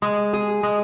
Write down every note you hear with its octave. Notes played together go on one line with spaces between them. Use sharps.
G#3
G#4
G#3